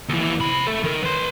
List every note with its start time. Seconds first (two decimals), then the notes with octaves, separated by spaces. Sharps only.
0.09 D#2 E3
0.40 C3 B5
0.67 A4 E5
0.83 D#3 A#4
1.03 B4 C6